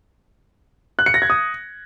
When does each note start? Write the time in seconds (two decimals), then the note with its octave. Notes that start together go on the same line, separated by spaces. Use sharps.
0.99 F#6
1.06 C#7
1.14 A#6
1.22 G#6
1.30 D#6